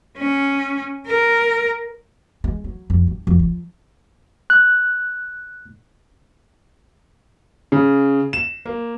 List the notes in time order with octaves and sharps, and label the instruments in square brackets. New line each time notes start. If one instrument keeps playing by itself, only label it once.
[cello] C#4
A#4
[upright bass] G#3
F#3
F2
G2
F2
F3
[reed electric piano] F#6
[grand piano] C#3
E7
A#3